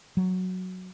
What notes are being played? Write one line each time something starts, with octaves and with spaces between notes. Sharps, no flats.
F#3